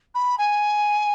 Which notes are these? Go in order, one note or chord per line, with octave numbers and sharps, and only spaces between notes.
B5
G#5